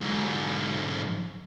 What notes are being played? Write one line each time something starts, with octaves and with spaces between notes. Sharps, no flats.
G#2 D3